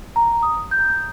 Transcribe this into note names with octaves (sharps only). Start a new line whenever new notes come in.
A#5
D#6
G6